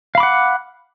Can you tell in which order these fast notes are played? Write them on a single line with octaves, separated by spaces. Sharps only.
F5 B5 D6 F#5